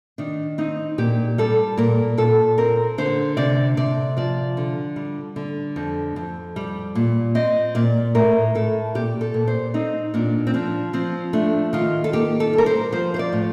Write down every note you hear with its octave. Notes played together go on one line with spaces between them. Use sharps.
D#3 D4
C4 D#4
A#2 G4
G3 A4
A#2 A#4
A#2 A4
C4 A#4
D3 C5
C3 D5
C3 D5
F3 D5
D3
G3
D3
F2
F2
G3
A#2
C4 D#5
A#2 D5
A2 A#4
A2 A4
A#2 G4
A4
A#2
C5
C4 D#4
A#2 D4
C4
F3 D4
F3 C4
A3 D4
D#3 F4
A4
A#3 G4
A4
G3
A#4
C5
F3 C5
C5
D5
A2